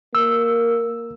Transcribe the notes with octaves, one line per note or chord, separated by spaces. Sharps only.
A#3 E6